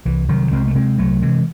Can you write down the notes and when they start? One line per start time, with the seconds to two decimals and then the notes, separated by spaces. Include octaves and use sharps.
0.05 C2 E3
0.29 C2 D#3 F#3
0.51 C2 G#3 C4
0.67 A3
0.75 C3 G#3 C4
0.98 C2 F#3 A3
1.22 C3 E3 G#3